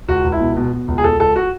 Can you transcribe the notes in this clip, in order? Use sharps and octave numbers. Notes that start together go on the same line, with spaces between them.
C#2 F#4
C#2
E4
B2
B2
B2
C#2
G#4
C#2 A4
C#2 A4
F#4